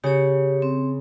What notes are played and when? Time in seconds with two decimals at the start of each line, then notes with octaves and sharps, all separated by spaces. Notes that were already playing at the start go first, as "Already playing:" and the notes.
0.04 C#3 G4 C#5
0.62 C4